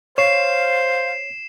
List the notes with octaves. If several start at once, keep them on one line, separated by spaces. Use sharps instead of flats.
C5 C#5 F5 C7 E7